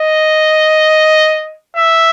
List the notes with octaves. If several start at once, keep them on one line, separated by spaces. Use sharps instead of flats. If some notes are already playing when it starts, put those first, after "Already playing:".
Already playing: D#5
E5